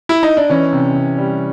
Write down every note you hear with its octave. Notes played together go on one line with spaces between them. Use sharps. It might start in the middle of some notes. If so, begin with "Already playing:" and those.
E4
D#4
D4
E3 C#4
C3
C3
G3